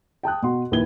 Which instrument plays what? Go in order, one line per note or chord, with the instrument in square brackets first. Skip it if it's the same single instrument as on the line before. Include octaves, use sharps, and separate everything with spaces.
[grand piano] G5 A5 D#6 F#6
B2 F#4 C6
A#1 D#2 E4 B4 G#6 G7